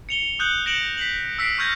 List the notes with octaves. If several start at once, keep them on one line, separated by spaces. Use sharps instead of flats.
C#7 F7 G7
D#6 F#6 G6 C#7 F#7
F#6 A#6 C#7 D7 E7 F#7
B6 C7 F#7
E6 B6 C7 D7
C#6 F6 G6 G#6 A#6 C#7